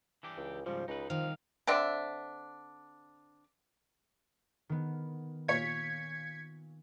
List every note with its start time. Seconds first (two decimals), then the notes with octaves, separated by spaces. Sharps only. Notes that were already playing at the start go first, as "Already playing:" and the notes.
0.23 E3 D4 G4
0.37 C#2
0.66 G#2 C#3 F3 G3
0.88 C#2 D#4 B4
1.10 C2 C3 D#3 F3 F5
1.67 D3 C4 D4 E5
4.69 D#3 B3
5.48 A#2 C#5 F5 G#6 B6 C#7